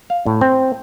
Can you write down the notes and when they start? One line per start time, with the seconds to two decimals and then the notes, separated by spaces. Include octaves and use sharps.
0.10 F5
0.26 A2
0.41 C4